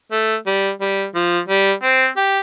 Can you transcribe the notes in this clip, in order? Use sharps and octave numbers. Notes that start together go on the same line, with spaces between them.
A3
G3
G3
F3
G3
C4
G4